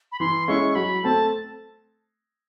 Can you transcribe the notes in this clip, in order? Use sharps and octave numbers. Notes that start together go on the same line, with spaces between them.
B5
E3 C6
G#3 C#4 E4 C#6
F#3 B5
A3 C4 A5